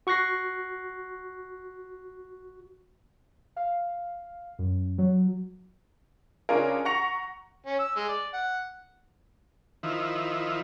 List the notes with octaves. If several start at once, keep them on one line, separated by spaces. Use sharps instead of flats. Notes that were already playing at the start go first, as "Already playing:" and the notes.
F#4 C#6 F#6 A#6 C7
F5
F#2
F#3
C#3 C#4 D4 F4 G#4 A#4
F#5 A#5 C#6 A#6 C#7 F7
C#4
E6
G#3
D5
F#5
D#3 F3 E4